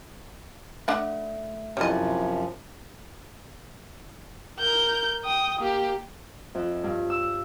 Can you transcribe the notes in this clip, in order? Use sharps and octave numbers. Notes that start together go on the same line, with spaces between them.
A3 D4 F#5
F#2 C3 F3 G3 E4 C#5 D#5
A#4 G6
G5 D#6
A#3 G4
F2
G2
E6